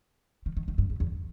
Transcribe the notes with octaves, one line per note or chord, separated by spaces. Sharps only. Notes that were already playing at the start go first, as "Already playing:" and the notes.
D#3
D#3
D#3
G2
E2
E2